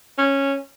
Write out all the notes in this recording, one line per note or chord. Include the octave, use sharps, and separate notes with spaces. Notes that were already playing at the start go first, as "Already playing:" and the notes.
C#4